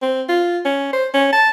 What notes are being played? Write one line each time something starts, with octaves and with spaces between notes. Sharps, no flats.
C4
F4
C#4
C5
C#4
A5